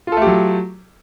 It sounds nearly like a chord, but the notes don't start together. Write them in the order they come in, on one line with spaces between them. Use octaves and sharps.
F4 A4 A3 G4 F#3